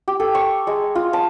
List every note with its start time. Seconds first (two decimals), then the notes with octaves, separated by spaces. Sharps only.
0.08 G4
0.20 A4
0.35 C#6
0.67 G#3
0.95 F4
1.13 A5